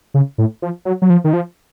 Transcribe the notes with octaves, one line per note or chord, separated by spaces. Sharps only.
C#3
A2
F3
F#3
F#3
F3
D#3
F3